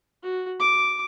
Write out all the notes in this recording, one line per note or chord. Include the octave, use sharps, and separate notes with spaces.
F#4
D6